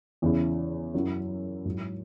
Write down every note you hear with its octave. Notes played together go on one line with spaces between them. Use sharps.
E2 C#3 E3 C#4 E4
F#2 F#3 E4
G#2 F#3 E4